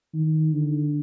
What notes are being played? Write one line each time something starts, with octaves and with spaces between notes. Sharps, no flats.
D#3
D3